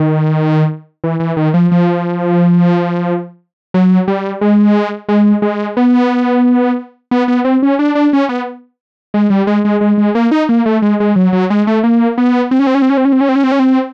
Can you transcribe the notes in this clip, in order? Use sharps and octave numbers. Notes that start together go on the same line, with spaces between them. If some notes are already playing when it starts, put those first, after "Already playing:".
Already playing: D#3
E3
E3
D#3
F3
F3
F#3
G3
G#3
G#3
G#3
B3
B3
B3
C4
C#4
D4
D4
C#4
B3
G#3
G3
G#3
G#3
G#3
G#3
A#3
D#4
A#3
A3
G#3
G#3
F#3
F#3
G#3
A3
A#3
B3
C4
C#4
C4
C#4
C4
C#4
C4
C#4
C4
C#4
C4
C#4
C4
C#4
C4